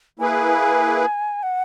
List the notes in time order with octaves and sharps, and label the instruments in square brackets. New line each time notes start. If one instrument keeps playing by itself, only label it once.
[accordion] A#3 E4 G#4 B4 [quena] G#5
[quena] F#5